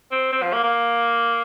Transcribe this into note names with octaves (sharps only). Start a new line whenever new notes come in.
C4
C4
F3
A#3
A#3